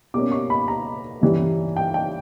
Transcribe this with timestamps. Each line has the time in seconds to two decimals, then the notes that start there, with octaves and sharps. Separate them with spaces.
0.14 B2 G3 A#3 C#4 D6
0.32 C#6
0.50 B5
0.68 A#5
1.22 G2 E3 G3 C#4
1.77 G5
1.94 G5